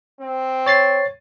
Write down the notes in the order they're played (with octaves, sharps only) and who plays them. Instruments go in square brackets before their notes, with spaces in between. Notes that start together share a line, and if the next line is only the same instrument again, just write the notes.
[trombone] C4
[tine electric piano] C#5 A6 C7